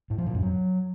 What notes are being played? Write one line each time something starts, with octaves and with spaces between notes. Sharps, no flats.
A2
F3
A#2
F#2
F#3